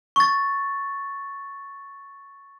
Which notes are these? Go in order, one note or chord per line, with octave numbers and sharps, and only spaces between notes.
C#6 A6